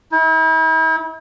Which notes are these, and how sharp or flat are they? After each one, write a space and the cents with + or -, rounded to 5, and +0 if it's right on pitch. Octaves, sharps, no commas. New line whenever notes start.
E4 -40